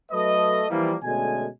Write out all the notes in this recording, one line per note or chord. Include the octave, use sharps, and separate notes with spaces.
F#3 A3 A4 B4 D#5
E3 F3 G3 A#3
B2 D3 G#3 A3 C#4 G#5